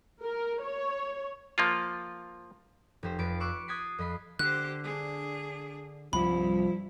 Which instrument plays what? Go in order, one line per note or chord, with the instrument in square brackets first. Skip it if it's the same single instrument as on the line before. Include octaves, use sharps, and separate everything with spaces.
[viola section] A#4
C#5
[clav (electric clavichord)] F3 A#3 F4
[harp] F1 G4 C5
F2 B4 A6 C7 D7
C#6 D6 E6 F#6 C#7 D7
D#6 F#6 G#6 A6 B6 C7
F2 D#5 B5 C7
[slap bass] D3 [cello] G4 C5 [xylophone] F#6
[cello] D4 G#4
[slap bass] C2 [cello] G2 E4 [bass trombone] F3 [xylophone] B5